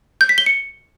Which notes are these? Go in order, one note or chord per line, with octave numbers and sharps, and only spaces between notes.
G6
B6
G7
C#7